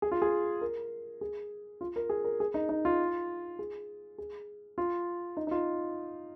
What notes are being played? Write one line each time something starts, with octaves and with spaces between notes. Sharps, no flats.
G#4
F4
G#4
A#4
G#4
F4
A#4
G#4
A#4
G#4
D#4
D#4
F4
G#4
G#4
F4
D#4
D#4
F4